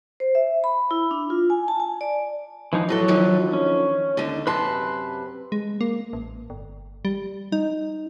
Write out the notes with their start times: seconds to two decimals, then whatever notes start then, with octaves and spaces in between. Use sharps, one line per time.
0.20 C5
0.35 E5
0.64 B5
0.91 E4
1.11 D4
1.30 F4
1.50 G#5
1.68 A5
1.80 G#5
2.01 D5
2.73 E3 F3 D#4
2.89 A2 E3 F#3 A4
3.08 D3 D#3 F3
3.53 C#4
4.17 D#2 D3
4.47 F#2 C3 B4 A5 C6
5.52 G#3
5.81 A#3
6.13 A1
6.50 G1
7.05 G3
7.52 D#4